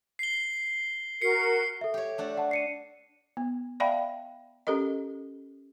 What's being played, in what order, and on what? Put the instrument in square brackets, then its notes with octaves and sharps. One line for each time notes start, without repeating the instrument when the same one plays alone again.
[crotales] C7 G7
[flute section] F#4 A#4 [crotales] C7 C#7
[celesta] A4 E5
[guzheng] G4 C#5
A3 D4 F#4
[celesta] F#5 A5
C7 C#7 D#7
[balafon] B3
D5 E5 F5 G5 A5 B5
C#4 G4 A4 A#4 D#5